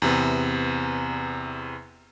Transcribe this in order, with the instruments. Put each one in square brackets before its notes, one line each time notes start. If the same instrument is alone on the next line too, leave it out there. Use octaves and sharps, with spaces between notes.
[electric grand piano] E2 C3 B3